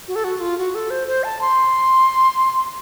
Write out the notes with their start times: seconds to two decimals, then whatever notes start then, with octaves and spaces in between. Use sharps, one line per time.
0.08 F#4
0.15 A4
0.24 F#4
0.40 F4
0.58 F#4
0.75 A4
0.90 C5
1.08 C5
1.24 A5
1.41 C6